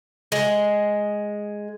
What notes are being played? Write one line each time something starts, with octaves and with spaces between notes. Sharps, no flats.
G#3